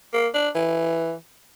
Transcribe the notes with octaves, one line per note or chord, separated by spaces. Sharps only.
A#3
D4
E3